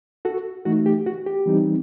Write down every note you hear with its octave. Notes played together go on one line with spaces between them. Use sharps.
F#4 A4
E3 A3 D#4 F#4
G4
F#4
G4
E3 G3 C4 D#4